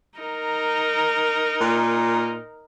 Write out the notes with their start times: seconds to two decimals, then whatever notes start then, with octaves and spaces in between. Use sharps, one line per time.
0.19 D#4 A#4
1.61 A#2